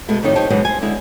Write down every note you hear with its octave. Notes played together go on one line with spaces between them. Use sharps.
B2 G#3 A3
F2 A2 D#3 D#4 C#5 D5
D#4 G4 C5 C#5 G5 A5
B2 E3 F#3 G#3 B3 C#4
C5 G#5
D3 G#3 E4